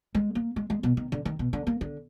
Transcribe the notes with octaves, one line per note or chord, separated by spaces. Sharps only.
G#3
A#3
G#3
G#3
B2
D#3
D3
D#3
B2
D3
A#3
D3